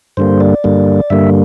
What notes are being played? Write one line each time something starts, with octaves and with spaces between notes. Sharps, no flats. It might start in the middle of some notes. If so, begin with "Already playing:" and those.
G2 D3 G3 A#3 C5
D5
G2 D3 G3 A#3
G2 D3 G3 A#3 E5